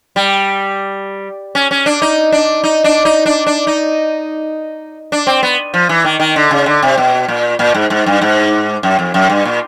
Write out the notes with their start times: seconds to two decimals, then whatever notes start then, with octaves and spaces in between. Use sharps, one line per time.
0.16 G3
1.55 C#4
1.71 C#4
1.86 D4
2.02 D#4
2.32 D4
2.64 D#4
2.84 D4
3.05 D#4
3.26 D4
3.47 D4
3.67 D#4
5.12 D4
5.27 C4
5.43 B3
5.74 F3
5.89 E3
6.05 D#3
6.20 D#3
6.36 D3
6.51 C#3
6.66 D3
6.83 C3
6.98 B2
7.28 A#2
7.59 A#2
7.75 G#2
7.90 G#2
8.06 G2
8.21 G#2
8.83 F#2
8.99 F2
9.14 F#2
9.30 G2
9.45 A#2